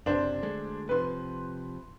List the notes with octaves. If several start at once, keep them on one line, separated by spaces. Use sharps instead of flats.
F#1 F#2 C3 D4 C5
D2 G#3 A3
C3 F3 B4 C6